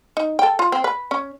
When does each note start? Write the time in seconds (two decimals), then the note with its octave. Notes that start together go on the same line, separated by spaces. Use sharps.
0.17 D#4
0.39 A4 G5
0.59 F4
0.72 C4
0.84 B4
1.11 C#4